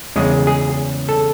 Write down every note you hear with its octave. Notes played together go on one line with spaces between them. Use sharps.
E2 C#3 G#3 G#4
G#4
A4